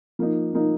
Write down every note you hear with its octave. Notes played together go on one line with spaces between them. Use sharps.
F3 A#3 D#4
F3 A#3 D#4